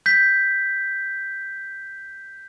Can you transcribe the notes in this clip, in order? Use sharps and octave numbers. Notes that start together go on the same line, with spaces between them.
G6 B6